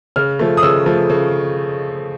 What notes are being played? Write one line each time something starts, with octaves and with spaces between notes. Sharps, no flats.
C#3 F6
F3 A3
D#6
C#3 E6
F3 A3
C#3